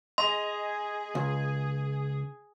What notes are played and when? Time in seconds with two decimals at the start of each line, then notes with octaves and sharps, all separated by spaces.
0.18 G#4 D#5 C6
1.15 C#2